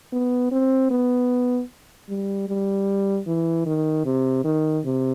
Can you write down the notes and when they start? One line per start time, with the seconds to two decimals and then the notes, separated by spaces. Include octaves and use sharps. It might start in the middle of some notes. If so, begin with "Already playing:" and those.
0.13 B3
0.51 C4
0.91 B3
2.09 G3
2.48 G3
3.27 E3
3.66 D#3
4.05 C3
4.44 D#3
4.84 C3